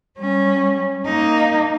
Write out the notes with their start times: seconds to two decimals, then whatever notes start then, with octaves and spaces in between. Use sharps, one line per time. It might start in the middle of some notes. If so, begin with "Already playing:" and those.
0.18 G3 C#4
1.05 A#3 D#4